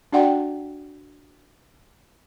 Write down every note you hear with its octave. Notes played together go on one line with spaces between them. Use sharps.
D4 F#4 D5 F#5 G5